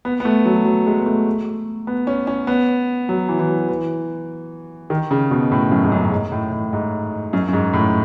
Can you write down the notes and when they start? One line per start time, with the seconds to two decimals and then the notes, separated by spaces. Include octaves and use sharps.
0.05 B3
0.20 B3
0.25 A3
0.46 F#3
0.65 F#3
0.87 G#3
1.00 B3
1.06 A3
1.87 B3
2.07 C#4
2.27 C#4
2.47 B3
3.09 F#3
3.29 E3
3.39 E3
3.49 F#3
3.69 E3
4.90 D#3
5.11 C#3
5.31 B2
5.52 A2
5.71 F#2
5.84 G#2
5.92 F#2
6.12 G#2
6.32 A2
6.52 A2
6.73 G#2
7.33 F#2
7.48 F#2
7.53 G#2
7.73 A2